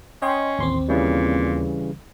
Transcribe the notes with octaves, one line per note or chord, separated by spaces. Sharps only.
C#4 D#5 G5 C6
A1 D#2 C4 C6
A#2 C#3 E3 G3